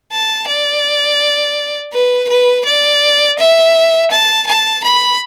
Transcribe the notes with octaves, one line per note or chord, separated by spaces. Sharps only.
A5
D5
B4
B4
D5
E5
A5
A5
B5